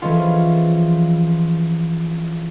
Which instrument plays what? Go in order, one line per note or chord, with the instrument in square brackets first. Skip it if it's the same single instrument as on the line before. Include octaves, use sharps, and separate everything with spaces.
[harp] E3 F3 G#3 C#4 F4